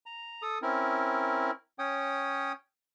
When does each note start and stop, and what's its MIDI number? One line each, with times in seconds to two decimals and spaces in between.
0.06 0.42 82
0.42 0.59 69
0.42 0.59 87
0.62 1.51 60
0.62 1.51 61
0.62 1.51 64
0.62 1.51 70
1.79 2.52 61
1.79 2.52 73
1.79 2.52 79
1.79 2.52 87